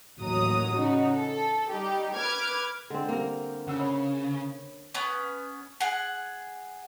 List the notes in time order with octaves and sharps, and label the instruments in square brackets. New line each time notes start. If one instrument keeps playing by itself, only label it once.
[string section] A1 D#2 F#3 A#5 D#6
C#3 D#4 F#4
A4
G3 D#4 G4
B4 D6 F6 G#6
[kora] D3 C4 [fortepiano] G#3 D4 C6
[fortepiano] G3 C4 [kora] A#3 A#4
[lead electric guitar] C#3 [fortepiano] F#5 E6
[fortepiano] C#5 B5
[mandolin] B3 C#4
G#4 F#5